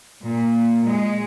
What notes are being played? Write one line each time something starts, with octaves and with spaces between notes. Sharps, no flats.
A#2
G#3